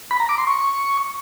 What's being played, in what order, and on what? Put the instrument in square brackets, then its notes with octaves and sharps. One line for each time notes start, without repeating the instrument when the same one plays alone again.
[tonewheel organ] B5
A#5
D6
C6
C#6